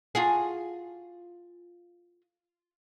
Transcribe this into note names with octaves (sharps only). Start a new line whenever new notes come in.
F4 F#4 G#4